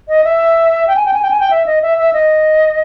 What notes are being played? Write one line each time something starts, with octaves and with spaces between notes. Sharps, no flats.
D#5
E5
G5
G#5
G5
G#5
G5
G#5
G5
E5
D#5
E5
E5
D#5